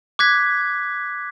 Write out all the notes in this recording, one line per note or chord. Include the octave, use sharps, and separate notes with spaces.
D6 F#6 G#6 B6